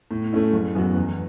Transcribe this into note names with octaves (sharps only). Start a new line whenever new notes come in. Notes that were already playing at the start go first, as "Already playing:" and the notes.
A2
A3 C#4 E4
F#1
F#2 E3 B3 F#4
E2